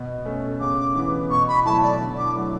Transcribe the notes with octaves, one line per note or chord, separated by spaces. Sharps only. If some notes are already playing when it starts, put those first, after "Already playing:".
Already playing: B2
A3 C#4
C#3 D6
E3 B3
B2 C#6
B5
F#3 A3 E4 A5
D5
D3
D6
F#3 A3 E4